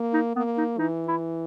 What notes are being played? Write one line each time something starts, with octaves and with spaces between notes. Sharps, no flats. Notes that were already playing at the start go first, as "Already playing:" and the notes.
Already playing: A#3
D#4
A#3 B3
D#4
E3 D#4
E4